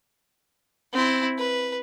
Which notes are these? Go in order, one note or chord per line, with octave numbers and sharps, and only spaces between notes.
C4 E4
B4